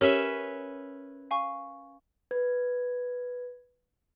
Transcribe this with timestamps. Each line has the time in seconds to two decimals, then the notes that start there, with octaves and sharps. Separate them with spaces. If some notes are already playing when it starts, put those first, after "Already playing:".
0.01 C#4 G4 A#4 B4 C#5 E5
1.31 F5 G#5 C#6
2.31 B4 G#6